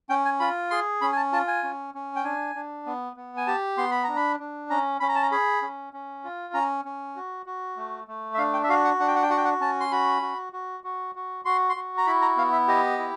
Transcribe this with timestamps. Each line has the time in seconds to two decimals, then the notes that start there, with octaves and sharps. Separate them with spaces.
0.10 C#4 G5
0.25 G#5
0.40 F4 B5
0.70 G#4 C6
1.01 C#4 B5
1.12 G#5
1.17 A5
1.32 F4 A5
1.47 G#5
1.64 C#4
1.94 C#4
2.16 G5
2.24 D4 G#5
2.55 D4
2.86 B3
3.16 B3
3.37 G#5
3.47 G4 A5
3.78 B3 C6
3.91 B5
4.04 D4 A#5
4.16 B5
4.40 D4
4.70 C#4 A#5
5.00 C#4 B5
5.08 A#5
5.15 A5
5.22 A#5
5.32 G#4 B5
5.62 C#4
5.93 C#4
6.24 F4
6.54 C#4 A#5
6.85 C#4
7.16 F#4
7.46 F#4
7.77 A3
8.08 A3
8.34 E5
8.38 D4 F5
8.53 G5
8.64 E5
8.69 F#4 F5
8.84 F#5
9.00 D4 F#5
9.08 G5
9.16 F#5
9.23 G5
9.30 F#4 F#5
9.37 G5
9.45 F#5
9.61 C#4 A5
9.80 C6
9.92 F#4 B5
10.22 F#4
10.53 F#4
10.84 F#4
11.15 F#4
11.45 F#4 C6
11.69 C6
11.76 F#4
11.97 A#5
12.07 E4 B5
12.22 A#5
12.37 B3 F5
12.52 E5
12.68 G4 D#5
12.98 E4